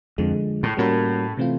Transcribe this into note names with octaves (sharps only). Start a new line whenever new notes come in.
F2 D3 F3 G#3
A2
A2 G3 A#3 C#4 F#4 A#4
C3 E3 A3 C4 F4